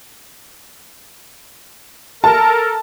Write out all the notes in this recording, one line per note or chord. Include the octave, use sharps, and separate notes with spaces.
A4 A#4 A5